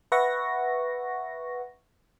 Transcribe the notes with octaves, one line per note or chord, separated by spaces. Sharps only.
B4 E5 F#5 C#6 A#6